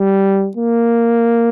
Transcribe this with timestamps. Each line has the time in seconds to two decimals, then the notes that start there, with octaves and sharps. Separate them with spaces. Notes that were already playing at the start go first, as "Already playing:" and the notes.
Already playing: G3
0.57 A#3